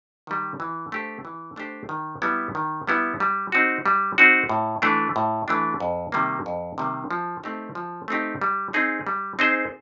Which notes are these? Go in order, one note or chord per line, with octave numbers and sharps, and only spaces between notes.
D#3 G3
E3
A3 D4 G4 C5
E3
A3 D4 G4 C5
D#3
G3 B3 E4
D#3
G3 B3 E4
G3
C4 D#4 F#4
G3
C4 D#4 F#4
A2
E3 A3 D4
A2
E3 A3 D4
F2
C3 D#3 G3 A#3
F2
C3 D#3 G3 A#3
F3
A3 C4 D#4 G4
F3
A3 C4 D#4 G4
G3
C4 D#4 G#4 C5
G3
C4 D#4 G#4 C5